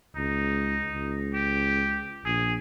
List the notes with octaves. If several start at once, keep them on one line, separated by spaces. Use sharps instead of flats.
C#2 D#4
C#2
G4
A#1 G#4